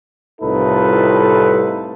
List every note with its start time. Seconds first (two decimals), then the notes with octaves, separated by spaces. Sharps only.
0.42 C2 A2 D#4 F4 A4 B4